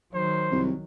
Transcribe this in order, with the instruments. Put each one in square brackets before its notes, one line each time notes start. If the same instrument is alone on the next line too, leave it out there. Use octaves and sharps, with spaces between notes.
[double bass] D#3 F#3 [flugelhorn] C5
[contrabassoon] C2